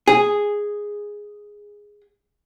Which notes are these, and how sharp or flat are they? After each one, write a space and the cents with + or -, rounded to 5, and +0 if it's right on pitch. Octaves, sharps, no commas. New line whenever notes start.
G#4 -5